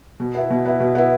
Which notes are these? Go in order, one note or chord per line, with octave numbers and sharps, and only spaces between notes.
B2
B3 E4
B2
B3 E4
B2
B3 E4